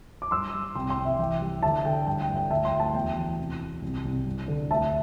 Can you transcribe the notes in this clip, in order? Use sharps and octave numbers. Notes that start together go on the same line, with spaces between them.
D6
G2 C6 E6
G3
C2 G5 C6
G5 C6
C2
E5
E3 G5
G3
D3 E5 A5
D3 G5
G2 G5
G5
G2
G5
D2 E5 A5
G5 C6
D2
E5 A5
E2 G5
E3
C3
C3
C2
C2
G2
D3
D2 E5 A5